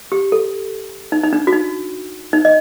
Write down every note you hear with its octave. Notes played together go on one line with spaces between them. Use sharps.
G4
A4
D#4
D#4
D4
F#4
D#4
D#4
D#5